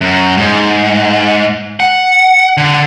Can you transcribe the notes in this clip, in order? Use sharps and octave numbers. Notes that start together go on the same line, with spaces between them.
F#2
G#2
F#5
D3